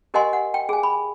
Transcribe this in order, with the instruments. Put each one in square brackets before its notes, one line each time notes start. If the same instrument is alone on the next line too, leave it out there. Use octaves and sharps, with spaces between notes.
[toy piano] G4 A#4 D#5 F#5 G#5 C6
F#5
G5
G#4 G#5
B5